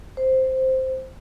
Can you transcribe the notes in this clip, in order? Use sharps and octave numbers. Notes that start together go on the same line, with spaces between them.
C5